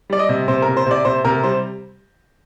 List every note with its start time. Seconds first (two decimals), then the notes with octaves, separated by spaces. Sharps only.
0.10 G3 D5
0.19 D#5
0.29 C3
0.48 C3 C5
0.62 A#4
0.68 C3
0.77 C5
0.86 C3 D5
1.05 C3 C5
1.25 C3 A#4
1.43 G3 C5